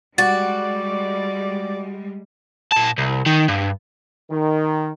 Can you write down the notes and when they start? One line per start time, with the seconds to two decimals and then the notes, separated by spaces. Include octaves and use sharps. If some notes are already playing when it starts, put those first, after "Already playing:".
0.18 G3 G#3 F#4 D5 A6
2.72 A#2 A5
2.98 C2
3.26 D#3
3.48 G2
4.30 D#3